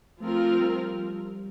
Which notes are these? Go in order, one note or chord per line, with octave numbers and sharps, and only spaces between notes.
F3 A3 C4 F4 A#4
G3